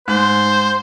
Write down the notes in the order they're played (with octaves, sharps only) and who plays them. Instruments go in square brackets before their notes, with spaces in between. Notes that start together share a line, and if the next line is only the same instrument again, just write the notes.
[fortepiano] G#2 F#6 [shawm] C5